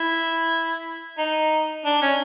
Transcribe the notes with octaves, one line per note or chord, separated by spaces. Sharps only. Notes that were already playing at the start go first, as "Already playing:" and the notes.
Already playing: E4
D#4
D4
C#4